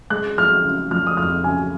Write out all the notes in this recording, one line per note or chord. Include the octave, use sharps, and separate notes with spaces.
G#3 F#6
F3 F6
C#3
F3 F6
D#6
F2 F6
C#3 G#5